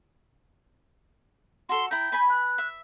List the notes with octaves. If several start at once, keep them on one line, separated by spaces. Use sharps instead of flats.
F#4 A4 C6
E4 G5 A#5 G6
B4 G#5 B5
F#6
E5